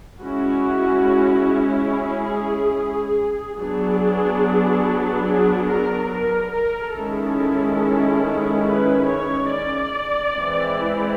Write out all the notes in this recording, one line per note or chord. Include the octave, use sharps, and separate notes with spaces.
G#3 C#4 E4 F#4
G#4
F#3 B3 D4 G#4
G#4
A#4
A#4
A#4
D#3 G#3 C#4 E4 A4
B4
C#5
D5
E3 G#3 C4 E4